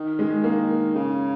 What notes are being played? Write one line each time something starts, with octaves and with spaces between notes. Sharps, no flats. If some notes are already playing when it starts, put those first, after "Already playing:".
Already playing: D#3
G#3
A#3
C#3